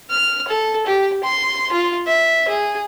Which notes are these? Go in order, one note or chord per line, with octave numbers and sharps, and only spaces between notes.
F6
A4
G4
C6
F4
E5
G#4